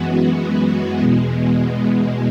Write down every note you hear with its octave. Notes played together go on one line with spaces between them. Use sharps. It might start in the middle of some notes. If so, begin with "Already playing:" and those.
Already playing: F#2 E3 G#3 B3 F#4
E2 B2 G#3